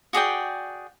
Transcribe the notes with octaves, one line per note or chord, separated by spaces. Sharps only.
F#4 G#4 D5 G5